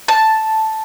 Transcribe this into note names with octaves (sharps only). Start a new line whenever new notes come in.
A5